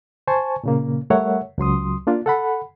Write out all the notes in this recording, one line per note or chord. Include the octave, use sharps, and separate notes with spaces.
C5 G#5 A5 C#6
A#2 C#3 A#3
G3 A3 A#4 C#5 E5 F#5
C#2 F#3 C6 D#6
A#3 D4 F4
A4 F#5 B5